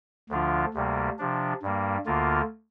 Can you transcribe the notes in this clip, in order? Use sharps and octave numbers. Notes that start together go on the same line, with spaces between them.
D2 D3 F3 D4 F4
D2 C3 G3 A#3
C3 F3 D4
G2 G3 A#3
D2 D3 A#3 F4